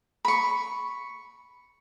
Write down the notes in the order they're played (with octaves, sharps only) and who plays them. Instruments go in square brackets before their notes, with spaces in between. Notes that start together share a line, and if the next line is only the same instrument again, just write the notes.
[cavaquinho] B5 C#6